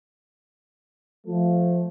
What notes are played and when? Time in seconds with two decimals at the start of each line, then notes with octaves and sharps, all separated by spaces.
1.27 F3 A3